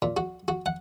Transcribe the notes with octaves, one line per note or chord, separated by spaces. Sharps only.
A#2
F#4
F#4
F#5